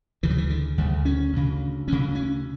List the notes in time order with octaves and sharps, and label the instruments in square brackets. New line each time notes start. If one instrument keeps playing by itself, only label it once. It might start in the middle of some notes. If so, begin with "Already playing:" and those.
[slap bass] D2 C#3 E3
F#3
E3
D3
D2 C#3 G3
C#4
D2 C#3
D2 C#4
C#3
C#4